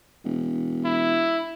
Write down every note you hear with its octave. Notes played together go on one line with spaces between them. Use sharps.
E1
E4